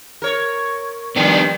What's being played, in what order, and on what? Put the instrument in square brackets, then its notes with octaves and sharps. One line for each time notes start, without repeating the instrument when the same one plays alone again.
[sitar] A#4 C#5
[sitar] D#3 F3 G3 [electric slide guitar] B3 D4